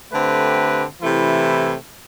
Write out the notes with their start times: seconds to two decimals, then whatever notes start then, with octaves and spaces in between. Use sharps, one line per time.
0.12 D3 A3 C4 G4 B4
1.02 C3 E3 A3 E4